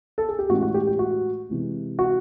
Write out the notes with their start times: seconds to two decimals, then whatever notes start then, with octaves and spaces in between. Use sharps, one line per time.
0.18 A4
0.29 G#4
0.39 G4
0.50 A2 E3 G#3 C#4 F#4
0.63 F#4
0.74 G4
0.87 G4
0.99 F#4
1.50 C3 E3 G#3
1.99 F#4